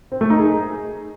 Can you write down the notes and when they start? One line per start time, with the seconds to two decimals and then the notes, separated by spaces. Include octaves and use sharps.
0.12 C4
0.21 A3
0.30 D#4
0.39 G#4